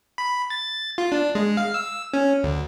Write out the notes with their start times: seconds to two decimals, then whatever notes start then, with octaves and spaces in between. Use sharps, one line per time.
0.18 B5
0.50 A6
0.98 F4
1.12 D4
1.35 G#3
1.57 F5
1.74 E6
2.13 C#4
2.43 D2